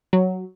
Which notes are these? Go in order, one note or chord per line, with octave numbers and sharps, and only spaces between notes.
F#3